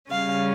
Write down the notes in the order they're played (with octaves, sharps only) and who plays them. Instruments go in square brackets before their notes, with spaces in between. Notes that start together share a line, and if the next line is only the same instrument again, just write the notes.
[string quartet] C#3 G3 C#4 F5